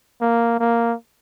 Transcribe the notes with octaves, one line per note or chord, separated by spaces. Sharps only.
A#3
A#3